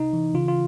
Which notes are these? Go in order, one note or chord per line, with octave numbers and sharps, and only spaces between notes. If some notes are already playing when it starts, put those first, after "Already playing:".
Already playing: C3 D#4
E3
C#3 F4
F4